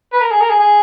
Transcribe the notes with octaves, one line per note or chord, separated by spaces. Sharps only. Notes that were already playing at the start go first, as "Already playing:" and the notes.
B4
A#4
G#4
A#4
G#4
G#4